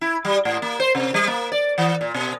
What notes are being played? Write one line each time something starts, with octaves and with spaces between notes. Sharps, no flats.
E4
G3
A2
A#3
C5
C3
G3
A#3
D5
E3
A#2
B2